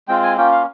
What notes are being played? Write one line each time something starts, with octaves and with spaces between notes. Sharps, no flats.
G#3 C4 F4 G5
G#5
A#3 C#4 F4 G5
F5